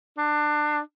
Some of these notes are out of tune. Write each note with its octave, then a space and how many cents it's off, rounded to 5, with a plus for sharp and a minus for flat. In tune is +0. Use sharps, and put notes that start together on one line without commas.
D4 +25